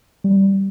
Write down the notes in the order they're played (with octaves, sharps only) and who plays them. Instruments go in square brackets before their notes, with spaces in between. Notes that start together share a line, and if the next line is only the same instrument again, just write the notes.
[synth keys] G3